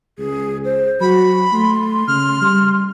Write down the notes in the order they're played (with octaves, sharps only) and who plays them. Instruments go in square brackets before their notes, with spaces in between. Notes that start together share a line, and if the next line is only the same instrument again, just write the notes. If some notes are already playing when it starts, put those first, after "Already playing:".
[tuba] C#2 [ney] G#4
[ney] C5
[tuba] F#3 [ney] F#4 [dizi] B5
[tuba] A3 [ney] C6
[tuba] C#3 [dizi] F6
[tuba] G3